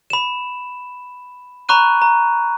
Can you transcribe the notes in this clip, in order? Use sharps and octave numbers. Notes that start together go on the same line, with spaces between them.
B5 E7
A#5 B5 C#6 F#6 D#7
A#5